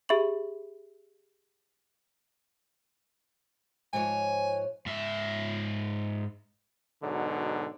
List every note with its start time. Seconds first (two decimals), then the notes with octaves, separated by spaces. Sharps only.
0.09 G4 G#4 E5 B5 C#6 F#7
3.93 G#2 F3 C#5 G#5
4.86 G#2 E5
7.02 G#2 B2 D3 F#3